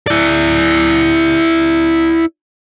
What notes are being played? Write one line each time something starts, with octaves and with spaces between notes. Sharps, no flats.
E4 D5